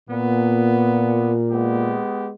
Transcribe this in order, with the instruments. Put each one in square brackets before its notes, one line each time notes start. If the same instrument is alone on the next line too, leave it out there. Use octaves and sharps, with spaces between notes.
[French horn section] A#2 [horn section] B3
[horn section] G#3 B3 G4